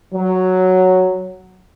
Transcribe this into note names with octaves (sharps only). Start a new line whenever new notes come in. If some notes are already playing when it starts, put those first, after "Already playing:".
F#3